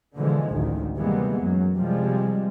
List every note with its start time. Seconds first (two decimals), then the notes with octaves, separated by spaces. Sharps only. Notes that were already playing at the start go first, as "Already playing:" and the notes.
0.15 B2 D3 E3 F3 G#3
0.49 A1 D2 D#3
0.96 C3 E3 G3 G#3 A#3 B3
1.41 F#2 F#3
1.75 C3 F3 G3 G#3